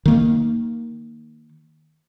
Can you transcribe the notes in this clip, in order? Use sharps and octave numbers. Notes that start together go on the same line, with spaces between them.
D#3 A#3